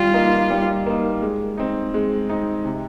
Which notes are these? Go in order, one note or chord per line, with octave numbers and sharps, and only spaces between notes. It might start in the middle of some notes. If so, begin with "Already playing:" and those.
Already playing: G3 F4
A#3 D#4
G3
A#3 D#4
G#3
C4 D#4
G#3
C4 D#4
C3